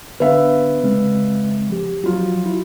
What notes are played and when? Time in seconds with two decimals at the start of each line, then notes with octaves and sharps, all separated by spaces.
0.20 D3 B3 D4 B4 E5 F5
0.83 C#3 G#3 C4
1.70 F3 G4
2.04 F3 F#3 F4
2.46 E4